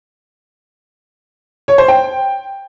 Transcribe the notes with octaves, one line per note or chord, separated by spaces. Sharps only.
C#5
C5
G5